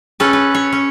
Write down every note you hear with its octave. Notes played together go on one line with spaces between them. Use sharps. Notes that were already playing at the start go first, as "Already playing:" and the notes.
C#4 A4 B4
B4
C#5
C#4